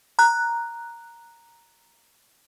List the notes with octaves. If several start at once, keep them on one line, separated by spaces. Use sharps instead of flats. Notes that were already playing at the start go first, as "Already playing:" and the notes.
A#5 F#6